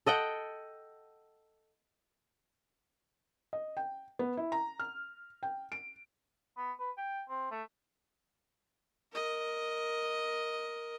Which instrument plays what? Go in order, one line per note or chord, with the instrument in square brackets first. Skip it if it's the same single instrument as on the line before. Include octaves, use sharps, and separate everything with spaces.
[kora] A4 D#5 F#5 G5
[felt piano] D#5
G5
B3
E4
A#5
F6
G5
D7
[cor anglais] B3
B4
G5
C4
A3
[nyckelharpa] A#4 D#5